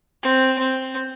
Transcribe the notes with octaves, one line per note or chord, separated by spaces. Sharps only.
C4
C4